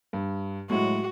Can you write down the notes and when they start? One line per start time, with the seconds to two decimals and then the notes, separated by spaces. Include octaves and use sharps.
0.13 G2
0.70 A2 F#3 G#3 F#4